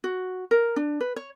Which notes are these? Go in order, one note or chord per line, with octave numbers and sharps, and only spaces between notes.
F#4
A#4
D4
B4
C#5